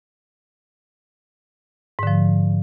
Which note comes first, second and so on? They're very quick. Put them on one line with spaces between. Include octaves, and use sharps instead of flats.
G#2 D3 F3